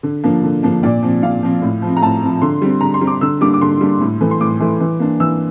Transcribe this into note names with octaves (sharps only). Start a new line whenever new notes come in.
D3
F3 A#3 D4
D3
F3 A#3 D4
A#2 D5
F3 C4
A#2 F5
F3 C4
A2
F3
C4
A#5
A2 A5
F3 C4
D3 C6
G3 C4
D3 A#5
C6
G3 C4
D6
D3 E6
G3 A#3 D4 D6
D6
D3 C6
G3 A#3 D4
A2
E3 A3
C6
A2 D6
E3 A3
E3
A#3 D4
E3 E6